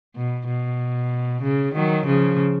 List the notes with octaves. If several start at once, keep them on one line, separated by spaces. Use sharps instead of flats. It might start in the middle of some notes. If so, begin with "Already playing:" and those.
B2
B2
C#3
D#3 F#3
C#3 F3